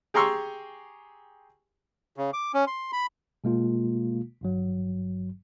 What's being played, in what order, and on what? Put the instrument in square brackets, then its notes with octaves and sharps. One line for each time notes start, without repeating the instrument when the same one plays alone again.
[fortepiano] G4 G#4 A#5 C6 C#6 E6
[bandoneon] C#3
D6
C#4
C6
B5
[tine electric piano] B2 G#3 A#3 F4
G#1 G2 F#3